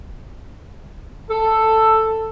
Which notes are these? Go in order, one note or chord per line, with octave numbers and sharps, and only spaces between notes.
A4